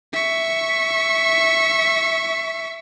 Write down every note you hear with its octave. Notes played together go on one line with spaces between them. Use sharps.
E5 C#6